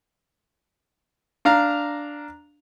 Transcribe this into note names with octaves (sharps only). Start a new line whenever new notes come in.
D4 F5 A#5